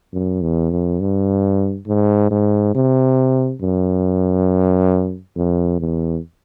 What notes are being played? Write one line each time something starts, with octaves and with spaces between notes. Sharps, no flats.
F#2
E2
F2
G2
G#2
G#2
C3
F#2
F2
E2